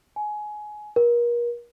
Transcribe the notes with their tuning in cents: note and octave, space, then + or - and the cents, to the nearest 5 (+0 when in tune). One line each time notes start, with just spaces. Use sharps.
G#5 +20
A#4 +35